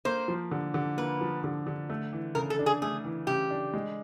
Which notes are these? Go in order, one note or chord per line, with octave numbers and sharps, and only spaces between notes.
A#3 C5
F3
D3
D3
A#3 B4
F3
D3
D3
A3
E3
C#3 A#4
A4
D4
G#4
A3 G#4
E3
C#3 G4
D4
G#3